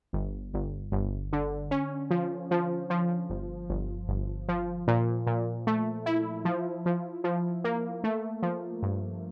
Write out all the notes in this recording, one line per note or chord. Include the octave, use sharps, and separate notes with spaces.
G1
G1
G1
D3
C#4
F3
F3
F3
G1
G1
G1
F3
A#2
A#2
A3
E4
F3
F3
F3
A#3
A3
F3
G2